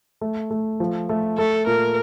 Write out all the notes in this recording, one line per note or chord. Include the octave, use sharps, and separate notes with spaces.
A3
A3
F3
A3
A3 A4
A#2 A#4